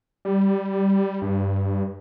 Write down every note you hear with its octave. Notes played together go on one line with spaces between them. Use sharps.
G3
G2